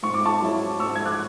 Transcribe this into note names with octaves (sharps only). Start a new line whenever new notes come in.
G#2 C#6
D6
A5 C#6
F#3 C#4 E4
G#2 C#6 E6
G#6
D6 F#6